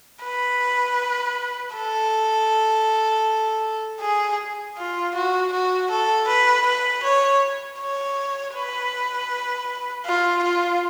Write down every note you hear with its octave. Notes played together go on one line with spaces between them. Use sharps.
B4
A4
G#4
F4
F#4
F#4
A4
B4
B4
C#5
C#5
B4
F4
F4